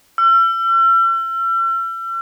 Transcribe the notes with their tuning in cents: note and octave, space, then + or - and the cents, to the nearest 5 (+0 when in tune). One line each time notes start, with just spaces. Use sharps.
E6 +45